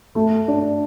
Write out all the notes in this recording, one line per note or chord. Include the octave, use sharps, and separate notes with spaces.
A3
D4